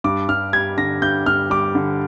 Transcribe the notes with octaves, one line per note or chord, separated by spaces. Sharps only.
G2 D6
G2 F6
G3 G#6
D3 A#6
G2 G6
G2 F6
G3 D6
D3